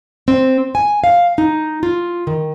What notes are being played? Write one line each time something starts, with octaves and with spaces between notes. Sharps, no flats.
C4
G#5
F5
D#4
F4
D#3